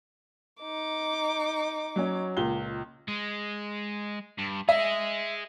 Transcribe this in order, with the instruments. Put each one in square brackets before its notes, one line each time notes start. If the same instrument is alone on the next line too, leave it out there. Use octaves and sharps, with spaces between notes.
[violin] D#4 D6
[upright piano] F#3 C#4
C#2 A#2 G7
[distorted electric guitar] G#3
G2
[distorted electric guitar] G#4 D#5 [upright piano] E5